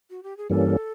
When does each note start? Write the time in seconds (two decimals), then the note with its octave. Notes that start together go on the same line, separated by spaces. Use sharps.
0.10 F#4
0.23 G4
0.37 G#4
0.50 G2 E3 G3 A#3 C#4 A4